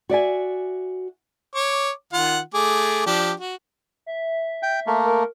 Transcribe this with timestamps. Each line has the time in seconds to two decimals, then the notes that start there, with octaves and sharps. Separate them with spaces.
0.09 F#4 D5 E5 G#5
1.54 C#5 D6
2.13 D#3 F4 F#5
2.54 A3 G#4 D6
3.06 F3 D4 G4
3.40 F#4
4.06 E5
4.63 G5
4.87 A3 A#3
5.06 A#4